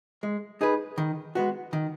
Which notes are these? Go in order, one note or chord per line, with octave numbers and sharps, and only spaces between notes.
G#3
D#4 G#4 B4
D#3
G#3 B3 F#4
D#3